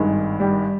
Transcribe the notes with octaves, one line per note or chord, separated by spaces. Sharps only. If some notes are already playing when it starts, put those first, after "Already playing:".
Already playing: G#1 G2 D#3 G#3
G3 G4